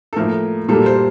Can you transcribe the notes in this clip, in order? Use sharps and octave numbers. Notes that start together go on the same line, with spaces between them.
A4
A2 F3 A#3 A#4
A#2 G3 A#3 A4
C5